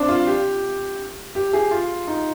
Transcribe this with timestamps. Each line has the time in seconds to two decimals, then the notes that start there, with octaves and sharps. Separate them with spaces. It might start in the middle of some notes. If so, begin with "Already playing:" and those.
Already playing: C4 D4
0.08 F4
0.26 G4
1.35 G4
1.53 G#4
1.71 F4
2.07 D#4